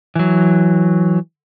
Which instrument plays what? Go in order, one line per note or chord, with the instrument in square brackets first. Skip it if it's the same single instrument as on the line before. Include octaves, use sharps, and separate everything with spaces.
[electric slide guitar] E3 F#3